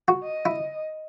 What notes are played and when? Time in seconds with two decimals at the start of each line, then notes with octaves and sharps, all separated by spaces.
0.08 F#4
0.23 D#5
0.46 E4